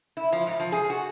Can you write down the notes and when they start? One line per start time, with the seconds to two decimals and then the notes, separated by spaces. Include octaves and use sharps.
0.17 E4
0.32 F3
0.47 G#2
0.60 F3
0.72 G#4
0.90 F#4